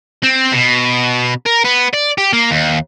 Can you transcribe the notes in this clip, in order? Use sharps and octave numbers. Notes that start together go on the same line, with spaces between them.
C4
B2
A#4
B3
D5
G4
A#3
D#2